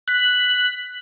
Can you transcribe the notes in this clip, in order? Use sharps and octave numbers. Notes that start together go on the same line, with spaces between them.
F#6 B6